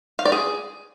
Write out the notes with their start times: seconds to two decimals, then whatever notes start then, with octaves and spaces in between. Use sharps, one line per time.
0.19 F5
0.25 D5
0.32 G#4